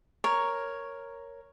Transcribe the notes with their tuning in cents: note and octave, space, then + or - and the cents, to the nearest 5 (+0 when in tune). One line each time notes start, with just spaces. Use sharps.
A#4 +0 C#5 +0